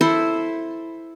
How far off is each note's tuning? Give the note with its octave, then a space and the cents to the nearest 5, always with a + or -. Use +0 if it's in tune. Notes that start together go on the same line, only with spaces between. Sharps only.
E4 +0 A4 +0 C5 +0